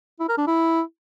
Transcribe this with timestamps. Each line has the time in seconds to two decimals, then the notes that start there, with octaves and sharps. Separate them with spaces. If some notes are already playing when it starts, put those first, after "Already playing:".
0.20 E4
0.29 A#4
0.38 D4
0.47 E4